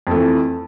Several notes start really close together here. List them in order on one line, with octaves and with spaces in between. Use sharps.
F2 A3 E3